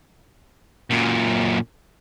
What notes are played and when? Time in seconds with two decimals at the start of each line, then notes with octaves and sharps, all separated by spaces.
0.90 F#2 A#2